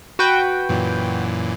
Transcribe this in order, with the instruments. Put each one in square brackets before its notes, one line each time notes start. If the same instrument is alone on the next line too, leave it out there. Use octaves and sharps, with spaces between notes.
[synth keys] F#4 B4 G5
[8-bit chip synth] F#2 A#2 E3